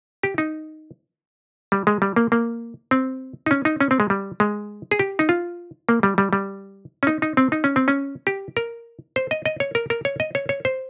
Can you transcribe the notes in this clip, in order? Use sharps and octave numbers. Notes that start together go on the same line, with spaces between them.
G4
D#4
G3
G#3
G3
A#3
A#3
C4
D#4
C#4
D#4
C#4
C4
G#3
G3
G#3
G#4
G4
D#4
F4
A#3
G3
G3
G3
C#4
D#4
D#4
C4
D#4
C#4
C4
C#4
G4
A#4
C5
D#5
D#5
C#5
A#4
A#4
C#5
D#5
C#5
C#5
C5